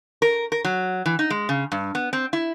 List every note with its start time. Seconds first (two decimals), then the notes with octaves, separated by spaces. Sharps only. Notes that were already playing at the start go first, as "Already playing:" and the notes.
0.22 A#4
0.52 A#4
0.65 F#3
1.06 E3
1.19 D#4
1.30 G#3
1.49 C#3
1.72 G2
1.95 B3
2.13 C4
2.33 E4